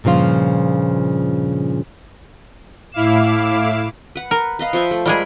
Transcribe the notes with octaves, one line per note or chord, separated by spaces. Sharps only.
G2 A#2 C#3 F3 F4
A2 E4 F5 D6 E7
B4 F#5
A#4
B4 D#5 F5
F3 C5 E5
A3
G3 G#3 G#4 A#4 B5 C6